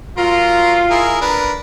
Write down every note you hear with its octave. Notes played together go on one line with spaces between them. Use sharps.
F#3 F4 A#4
E4 G#4 A#4
D4 A#4 B4